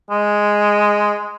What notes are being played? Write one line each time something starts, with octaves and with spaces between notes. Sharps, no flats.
G#3